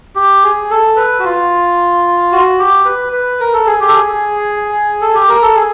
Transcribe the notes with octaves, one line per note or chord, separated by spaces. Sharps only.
G4
G#4
A4
B4
F#4
F4
F#4
G4
B4
B4
A#4
A4
G#4
G4
A4
G#4
A4
G4
A#4
A4
G#4